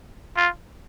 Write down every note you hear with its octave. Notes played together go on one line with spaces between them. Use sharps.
F4